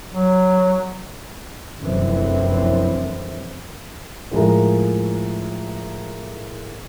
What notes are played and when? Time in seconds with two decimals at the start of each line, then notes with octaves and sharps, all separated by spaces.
0.12 F#3
1.80 F1 A#1 F#2 E3 C4
4.31 A2 F3 G#3 A#4 A#5